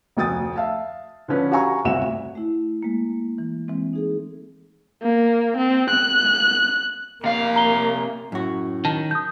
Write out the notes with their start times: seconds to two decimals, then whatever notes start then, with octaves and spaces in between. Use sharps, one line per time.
0.17 F1 D2 G5 D#6 A6
0.56 E5 F5 A5
1.28 D3 F3 C#4 B4
1.51 F#4 G4 F5 G#5 A#5 C#6
1.85 G1 D2 C3 F#4 E5 E7
2.35 A3 E4
2.83 G#3 A#3
3.38 E3
3.68 E3 G#3 C4
3.93 D#4 G#4 A4
5.02 A#3
5.57 C4
5.90 F#6
7.24 C3 A#3 F5
7.56 A#5 G7
8.32 F#2 A2 F#4
8.85 D#3 A5
9.11 D#6 G6